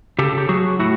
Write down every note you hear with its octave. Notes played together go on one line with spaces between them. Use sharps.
C#3 G4 A4
G4
F#3 F#4 G#4
A2 E4 F#4